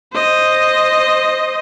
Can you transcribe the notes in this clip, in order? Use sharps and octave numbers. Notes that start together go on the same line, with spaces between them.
C5 D#5